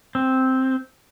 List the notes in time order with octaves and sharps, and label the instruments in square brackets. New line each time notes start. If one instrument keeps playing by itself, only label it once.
[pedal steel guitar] C4